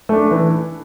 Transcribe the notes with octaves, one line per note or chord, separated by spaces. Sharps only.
A3 D4
E3